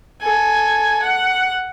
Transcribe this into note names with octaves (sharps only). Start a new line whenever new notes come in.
A4 G#5
F#5